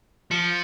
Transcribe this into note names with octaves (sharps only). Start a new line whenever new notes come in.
F3 C#7